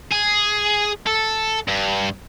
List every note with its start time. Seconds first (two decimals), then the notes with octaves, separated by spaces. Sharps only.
0.12 G#4
1.07 A4
1.68 G2